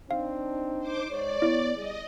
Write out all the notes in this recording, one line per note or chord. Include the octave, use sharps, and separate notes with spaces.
C4 D4 D#4 F5
C5 D6
G#2 C#5 D5
B3 E4
G3 G#4 D#5